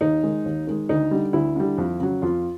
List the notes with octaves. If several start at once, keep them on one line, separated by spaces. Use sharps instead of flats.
D#2 D#4
D#3 G#3
D#2
D#3 G#3
D2 D#4
D3 G3
D2 E4
D3 G3
F2
C#3 F#3
F2 F4